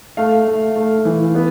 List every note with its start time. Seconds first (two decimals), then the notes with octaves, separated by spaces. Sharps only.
0.17 A3 F5
0.47 A3
0.76 A3
1.05 E3
1.35 B3